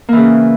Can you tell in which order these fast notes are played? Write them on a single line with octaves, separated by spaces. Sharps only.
A#3 E3 C#3